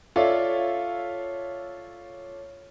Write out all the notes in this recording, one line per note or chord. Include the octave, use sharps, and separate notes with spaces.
F4 A4 C#5 D5 E5 F5